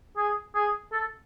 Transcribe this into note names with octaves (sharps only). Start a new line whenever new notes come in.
G#4
G#4
A4